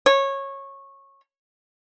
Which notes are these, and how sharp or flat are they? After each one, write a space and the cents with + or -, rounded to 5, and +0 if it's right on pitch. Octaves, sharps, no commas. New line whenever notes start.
C#5 -15